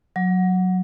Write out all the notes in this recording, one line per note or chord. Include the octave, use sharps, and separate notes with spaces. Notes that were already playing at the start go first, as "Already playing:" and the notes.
F#3